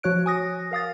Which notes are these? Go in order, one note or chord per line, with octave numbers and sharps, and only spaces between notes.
F3 F#4 C#5 F#6 D7
G#5 D#6 A#6
A#4 F5 D#6 A6